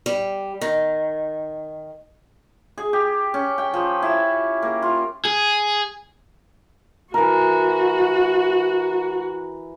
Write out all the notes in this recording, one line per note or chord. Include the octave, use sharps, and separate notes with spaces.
G3
D#3
G#4
G4
C#4
G5
F3
E4
A#3
F4
G#4
E3 F#4 A#4